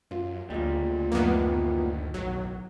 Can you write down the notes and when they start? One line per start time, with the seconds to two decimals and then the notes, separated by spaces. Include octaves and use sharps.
0.11 F#2 F4
0.50 D2 A#2 C#3 G3 G#3
1.12 F#2 A2 D#3 A#3 B3
2.14 B1 F#3